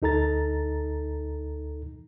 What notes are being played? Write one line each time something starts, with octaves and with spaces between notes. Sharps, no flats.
D2 D#4 A4 A#5 A6